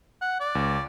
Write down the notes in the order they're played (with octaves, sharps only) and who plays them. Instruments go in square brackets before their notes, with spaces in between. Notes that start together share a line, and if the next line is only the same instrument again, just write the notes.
[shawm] F#5
D5
[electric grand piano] C#2